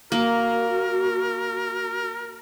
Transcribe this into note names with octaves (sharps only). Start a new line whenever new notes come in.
A#3 F#4 A#4